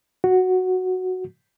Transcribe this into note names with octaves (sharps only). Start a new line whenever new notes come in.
F#4